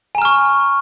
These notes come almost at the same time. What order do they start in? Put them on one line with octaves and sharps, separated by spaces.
G#5 A#5 F6 C#6